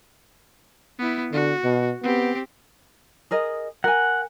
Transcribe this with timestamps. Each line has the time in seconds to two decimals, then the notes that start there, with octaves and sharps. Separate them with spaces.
0.99 B3 E4
1.33 D3 F#4
1.64 B2
2.03 B3 C4 G4
3.31 G#4 A#4 D#5
3.84 A#4 F#5 G#5